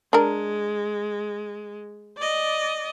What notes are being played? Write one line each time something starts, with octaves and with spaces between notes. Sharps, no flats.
G#3 D4 A#4
D5 D#5